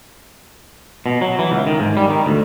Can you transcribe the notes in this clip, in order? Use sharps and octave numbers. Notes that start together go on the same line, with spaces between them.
B2
F#3
E3
C#2
D#3
G#2
G3
D#3
D2